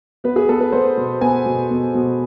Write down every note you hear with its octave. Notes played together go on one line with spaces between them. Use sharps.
B3 B4
G#4
B3 A4
B4
B3 C5
B2
B3 G#5
B2
B2
B2